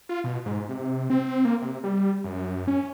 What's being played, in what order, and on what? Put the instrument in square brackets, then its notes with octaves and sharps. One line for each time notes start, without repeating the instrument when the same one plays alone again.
[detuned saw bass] F4
B2
G#2
C3
C4
A#3
C3
G3
F#2
F#2
C#4